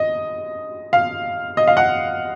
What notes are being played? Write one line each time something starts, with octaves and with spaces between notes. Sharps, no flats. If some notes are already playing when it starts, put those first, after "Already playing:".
Already playing: D#5
F5
D#5
F5
F#5